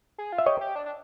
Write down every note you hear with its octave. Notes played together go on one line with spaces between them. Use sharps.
G#4
F4
E5
G4 C#5 D#5
G4
D4
D4